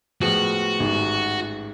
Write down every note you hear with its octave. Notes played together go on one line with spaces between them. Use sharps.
A2 F3 G#3 B3 F#4
A1 G#2 D#3